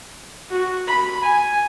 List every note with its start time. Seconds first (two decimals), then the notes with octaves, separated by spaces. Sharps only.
0.50 F#4
0.87 B5
1.23 G#5